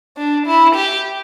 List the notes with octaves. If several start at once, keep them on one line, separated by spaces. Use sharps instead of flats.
D4
E4
G4